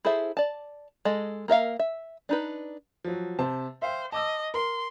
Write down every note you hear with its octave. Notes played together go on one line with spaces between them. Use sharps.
E4 G#4 A4 C5 E5
D5 A5
G#3 A4 D#5
A#3 A#4 E5 F5
E5
D4 D#4 B4
F3 F#3
C3 C5 A5
C5 E5 F5 G5
D#5 A5 D6 E6
A#4 C6